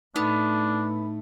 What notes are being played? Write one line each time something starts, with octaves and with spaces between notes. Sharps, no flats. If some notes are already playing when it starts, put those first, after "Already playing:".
A2 A3 B3 D4 D#4